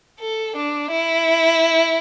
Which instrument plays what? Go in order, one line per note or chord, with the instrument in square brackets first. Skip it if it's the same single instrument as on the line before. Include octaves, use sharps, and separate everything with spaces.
[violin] A4
D4
E4